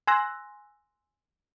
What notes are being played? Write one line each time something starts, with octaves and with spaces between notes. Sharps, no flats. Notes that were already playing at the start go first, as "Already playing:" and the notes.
G#5 C6 E6 F#6 A#6